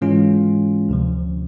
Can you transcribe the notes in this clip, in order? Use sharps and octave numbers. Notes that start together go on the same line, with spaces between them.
G#2 E3 G#3 C#4 F4
D2 C3 F3